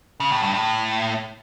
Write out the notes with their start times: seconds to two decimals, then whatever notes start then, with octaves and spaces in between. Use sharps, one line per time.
0.20 C#3
0.31 A2
0.43 G2
0.54 A2